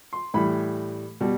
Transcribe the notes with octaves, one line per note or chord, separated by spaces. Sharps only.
C6
A2 E3 G3 B5
B2 G3